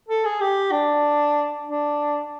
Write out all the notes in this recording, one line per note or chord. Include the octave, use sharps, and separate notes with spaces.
A4
G#4
G4
D4
D4